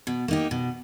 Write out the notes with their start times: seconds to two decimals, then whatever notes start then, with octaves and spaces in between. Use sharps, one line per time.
0.07 B2
0.28 A#3 D#4 G4
0.51 B2